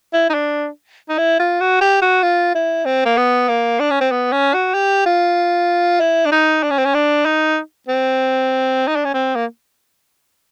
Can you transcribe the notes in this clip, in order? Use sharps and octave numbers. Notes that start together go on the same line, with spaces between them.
E4
D#4
D4
D#4
E4
F4
F#4
G4
F#4
F4
E4
C4
A#3
B3
A#3
D4
C#4
C4
B3
C#4
F#4
G4
F4
E4
D4
D#4
D4
C#4
C4
C#4
D4
D#4
C4
D#4
D4
C#4
C4
A#3